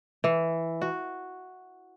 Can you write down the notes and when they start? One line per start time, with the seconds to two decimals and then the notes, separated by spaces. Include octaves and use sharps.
0.24 E3
0.82 F#4